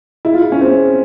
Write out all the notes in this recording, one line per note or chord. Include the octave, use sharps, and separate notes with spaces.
E4
F4
E4
C#4
C4